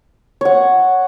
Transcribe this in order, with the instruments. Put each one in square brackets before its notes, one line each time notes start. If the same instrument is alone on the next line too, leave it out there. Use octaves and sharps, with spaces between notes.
[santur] C#5 F#5